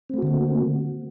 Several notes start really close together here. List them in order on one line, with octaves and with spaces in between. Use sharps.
C4 A3 F#4 D3 A#3